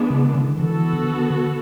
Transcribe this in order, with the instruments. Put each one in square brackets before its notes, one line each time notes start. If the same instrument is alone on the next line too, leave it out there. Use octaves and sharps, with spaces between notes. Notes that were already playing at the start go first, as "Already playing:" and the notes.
Already playing: [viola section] E3 G#3 B3 D4
[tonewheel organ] C#3
D3
[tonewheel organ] E3 [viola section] B3 F#4 A4
[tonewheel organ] D3